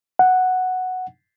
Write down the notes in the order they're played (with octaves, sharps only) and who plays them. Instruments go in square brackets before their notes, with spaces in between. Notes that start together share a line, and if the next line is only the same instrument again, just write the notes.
[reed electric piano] F#5